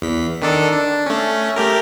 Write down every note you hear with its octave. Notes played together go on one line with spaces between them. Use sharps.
E2 B6
D#3 D4 A4
D4
A3 C#4
A3 G4 A#4